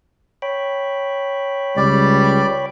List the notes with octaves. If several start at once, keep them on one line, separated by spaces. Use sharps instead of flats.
C#5 G5 B5
C#2 G3 D5